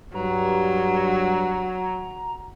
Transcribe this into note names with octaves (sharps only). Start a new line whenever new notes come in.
G2 F#3 A#5